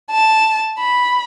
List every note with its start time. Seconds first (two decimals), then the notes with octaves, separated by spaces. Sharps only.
0.11 A5
0.79 B5